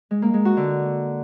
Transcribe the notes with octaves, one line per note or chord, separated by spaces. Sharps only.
G#3
A#3
G#3
F#4
D3